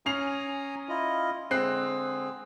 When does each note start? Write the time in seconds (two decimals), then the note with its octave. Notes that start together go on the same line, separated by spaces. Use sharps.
0.06 C#4 G#5 A#5 D#6 C7 F7
0.89 E4 F4 D#5
1.51 D3 G#3 C4 G#4 F#6 C7